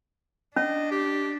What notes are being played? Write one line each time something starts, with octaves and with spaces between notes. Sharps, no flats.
C#4 D4 D#5
G4